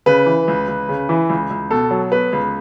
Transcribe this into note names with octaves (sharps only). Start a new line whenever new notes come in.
C#3 B4
E3
C#2
C#2
C#3
E3
C#2
C#2
B2 A4
F#3
B3 B4
C#2